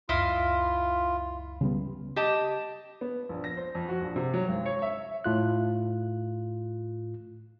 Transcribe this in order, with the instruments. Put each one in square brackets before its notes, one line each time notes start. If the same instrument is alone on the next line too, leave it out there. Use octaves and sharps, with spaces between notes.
[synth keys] C#2 F#2 [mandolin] E4 D#5 F5 [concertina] F4
[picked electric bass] C#3 G3 B3
[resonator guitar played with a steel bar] G4 D#5 A5
[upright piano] B3
A#1
A#6
C5
F2
F#4
A#1
C3
F#3
G#1
C#5
E5
[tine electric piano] A2 F4 F#6